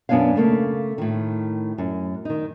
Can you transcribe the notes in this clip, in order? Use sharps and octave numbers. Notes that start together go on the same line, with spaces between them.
F#2 B2 B3 D4 C#5 F5
C#3 A3 A#3
A2 D#3
F#2
D#3 D#4